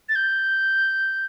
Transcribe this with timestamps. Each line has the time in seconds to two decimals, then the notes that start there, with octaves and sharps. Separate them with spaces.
0.09 A6
0.15 G6